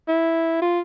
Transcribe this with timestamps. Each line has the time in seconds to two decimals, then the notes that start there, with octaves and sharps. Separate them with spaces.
0.08 E4
0.62 F4